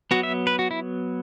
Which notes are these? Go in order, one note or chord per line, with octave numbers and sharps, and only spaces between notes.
F#3 B3 F#4
E5
B4
F#4
E4